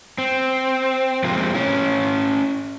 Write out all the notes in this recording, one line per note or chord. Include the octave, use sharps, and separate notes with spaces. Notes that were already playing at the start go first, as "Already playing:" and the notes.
C4
C3 F3 G#3 A#3 C4
C#4 E4